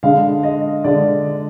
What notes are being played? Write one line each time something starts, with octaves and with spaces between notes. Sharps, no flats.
D3 G#3 D4 F5
D#5
D3 G#3 D4 D5